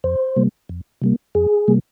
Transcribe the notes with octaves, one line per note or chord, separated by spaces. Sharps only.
F2 C5
C3 G3 A#3
F2
C3 G3 A#3
F2 G#4
C3 G3 A#3